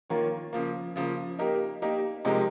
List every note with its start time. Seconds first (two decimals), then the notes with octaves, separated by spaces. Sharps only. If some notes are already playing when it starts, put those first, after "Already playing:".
0.10 D#3 A#3 F4 A#4 C#5
0.53 C#3 F3 A#3
0.96 C#3 F3 A#3
1.39 A#3 D#4 G4 A#4
1.82 A#3 D#4 G4 A#4
2.25 C3 F3 G#3 D#4 A#4